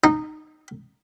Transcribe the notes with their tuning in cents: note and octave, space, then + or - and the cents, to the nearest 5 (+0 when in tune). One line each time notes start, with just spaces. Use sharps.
D#4 -15